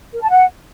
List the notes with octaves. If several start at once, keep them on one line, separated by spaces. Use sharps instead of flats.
A#4
A5
F#5